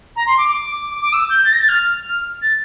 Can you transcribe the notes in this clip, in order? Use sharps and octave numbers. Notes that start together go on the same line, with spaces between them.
A#5
C6
D6
D6
D6
E6
G6
A6
A#6
A6
F6
A6